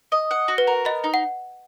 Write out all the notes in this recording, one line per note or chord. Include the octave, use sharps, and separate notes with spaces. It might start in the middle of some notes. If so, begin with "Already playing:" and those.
D#5
F#5
F#4
B4
A#4
B3 D#5
D#4
F#5